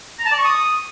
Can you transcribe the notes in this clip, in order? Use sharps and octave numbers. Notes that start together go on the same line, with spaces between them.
A#5
A5
D5
C#6
D#6